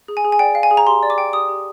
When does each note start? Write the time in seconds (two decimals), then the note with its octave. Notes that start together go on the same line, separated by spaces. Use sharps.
0.08 G#4
0.17 G#5
0.25 G#4
0.32 G#5
0.39 D5 G5
0.55 F5
0.63 G#5
0.71 G#4
0.77 A#5
0.87 G4 C6
1.03 D5
1.10 D6
1.18 G5
1.33 G4 D#6
1.49 G4